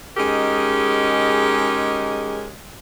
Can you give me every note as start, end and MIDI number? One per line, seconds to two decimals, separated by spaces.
0.17 2.53 56
0.17 2.53 61
0.17 2.53 63
0.17 2.53 67
0.17 2.53 68
0.17 2.53 70